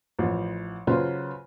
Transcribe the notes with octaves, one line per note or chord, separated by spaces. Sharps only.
A1 F3
C#3 F#3 F4 B4 C5